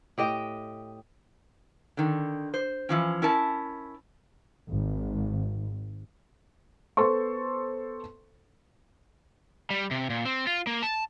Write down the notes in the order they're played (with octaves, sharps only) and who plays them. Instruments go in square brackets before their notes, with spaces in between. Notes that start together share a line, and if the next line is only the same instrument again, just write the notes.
[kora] A2 G4 D#5 G5
[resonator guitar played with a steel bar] D3 D#3
C5
E3 F3 C#4
C#4 E4 A#4 A5
[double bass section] G#1
[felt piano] B3 A4 C5 C6 C#6
[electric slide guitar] G3
C3
A#2
C4
F4
A#3
A5